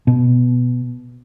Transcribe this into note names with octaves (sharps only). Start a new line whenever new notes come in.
B2